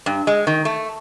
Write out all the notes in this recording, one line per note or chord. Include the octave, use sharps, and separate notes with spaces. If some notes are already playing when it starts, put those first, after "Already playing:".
G2
G#3
D#3
A3